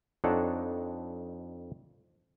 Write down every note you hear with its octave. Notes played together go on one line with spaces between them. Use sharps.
F2 D4 D#4 A4 C#5 F#5